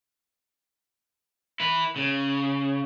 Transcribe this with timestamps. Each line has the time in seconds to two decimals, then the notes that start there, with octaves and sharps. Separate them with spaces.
1.60 E4 B4
1.96 C#3